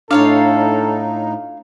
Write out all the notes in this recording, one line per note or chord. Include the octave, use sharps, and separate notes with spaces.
A2 D4 D#4 F4 A4 C#5 F5